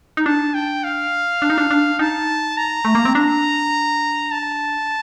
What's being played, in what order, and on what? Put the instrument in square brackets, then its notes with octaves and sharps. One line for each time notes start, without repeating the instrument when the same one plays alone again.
[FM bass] D#4
[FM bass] D4 [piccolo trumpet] A5
[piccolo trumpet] G5
F5
[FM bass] D4
D#4
D4
D4
[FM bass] D#4 [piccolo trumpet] A5
[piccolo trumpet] A#5
[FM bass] A3
A#3
C4
[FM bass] D4 [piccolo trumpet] A#5
[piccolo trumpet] A5